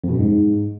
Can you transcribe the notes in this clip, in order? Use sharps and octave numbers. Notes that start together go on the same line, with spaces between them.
F2
B2
F#2
G#2